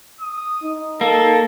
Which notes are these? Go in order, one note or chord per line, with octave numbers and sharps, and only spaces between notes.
D#6
D#4
A#3 A4